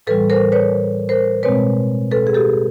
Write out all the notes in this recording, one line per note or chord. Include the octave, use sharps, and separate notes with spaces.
A2 E3 G3 A4 B4
A#4 C5
B4 C#5
A#4 C5
B2 G#3 C4 B4 C#5
A4 B4
G#4
G4 A4